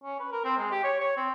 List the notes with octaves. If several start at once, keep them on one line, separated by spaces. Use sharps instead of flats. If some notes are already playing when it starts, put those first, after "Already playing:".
C#4
B4
A#4
C4
G#3
G4
C#5
C#5
C4